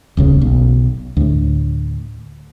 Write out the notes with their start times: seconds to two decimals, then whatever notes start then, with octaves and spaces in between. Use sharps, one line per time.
0.17 D#1 C#2 C#3
0.42 B1
1.17 D2 A2